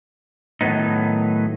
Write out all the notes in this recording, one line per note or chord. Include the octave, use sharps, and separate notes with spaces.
A2 D#3 F#3 B3 D#4